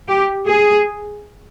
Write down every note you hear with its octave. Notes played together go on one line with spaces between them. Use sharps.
G4
G#4